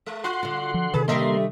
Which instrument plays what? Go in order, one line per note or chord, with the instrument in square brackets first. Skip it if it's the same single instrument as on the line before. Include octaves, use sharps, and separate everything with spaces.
[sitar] G#3
[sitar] F4 [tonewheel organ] F#5 C6
[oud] D3 F#4
[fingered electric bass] F3
[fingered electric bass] C3 D#3 [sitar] G#4 [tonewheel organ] B4
[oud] D3 G3 G4 [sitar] A3 D#5 E5 [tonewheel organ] A#3 C6